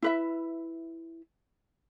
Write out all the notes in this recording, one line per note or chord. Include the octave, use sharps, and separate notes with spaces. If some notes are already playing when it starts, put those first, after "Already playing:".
E4 B4 E5